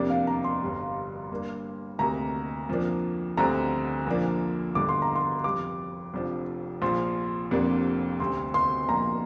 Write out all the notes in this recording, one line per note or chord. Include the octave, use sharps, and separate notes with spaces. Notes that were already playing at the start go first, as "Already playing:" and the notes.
Already playing: F2 C3 A#3 D4 D5
F5
A#5
C6
G1 G2 G3
G2 G3 A#3 D4
D2 C3 A#3 A#5
F2 F3 A#3 D4
D2 D3 G3 C4 A#5
A#1 A#2 F3 A#3 D4
G1 G2 D3 D6
C6
A#5
C6
F2 C3 G3 D6
F1 F2 F3 D4
A#1 A#2 F3 C6
F1 F2 C3 A#3 D4
D2 C3 G3 C4 C6
C6
A#1 A#2 A#3 D4 A#5